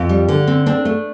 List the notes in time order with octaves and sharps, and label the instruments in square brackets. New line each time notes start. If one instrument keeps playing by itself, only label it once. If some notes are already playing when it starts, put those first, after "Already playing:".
Already playing: [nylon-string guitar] F2
G3
D3
C4
C4 D4
A3